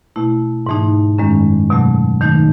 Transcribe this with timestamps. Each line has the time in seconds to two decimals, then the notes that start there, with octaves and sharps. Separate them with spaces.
0.16 B2 A3 E4
0.66 G#2 E3 A3 D#4
1.18 F#2 D#3 G#3 C#4
1.70 B2 F#3 A3
2.21 D#3 A3 D#4